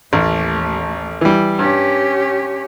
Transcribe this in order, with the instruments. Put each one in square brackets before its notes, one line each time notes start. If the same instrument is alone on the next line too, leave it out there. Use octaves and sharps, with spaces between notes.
[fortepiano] A1 [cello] D#2 A3
[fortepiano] E3 G3
[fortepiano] G2 [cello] C#4 G4